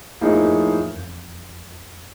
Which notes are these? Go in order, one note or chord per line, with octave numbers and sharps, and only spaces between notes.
F2 A2 F3 A#3 D#4 G#4
F2
E2
F2